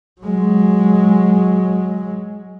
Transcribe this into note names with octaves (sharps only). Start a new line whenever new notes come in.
F#3 G#3